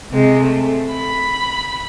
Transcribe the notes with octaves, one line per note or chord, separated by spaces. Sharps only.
C3 G#3
A3
B5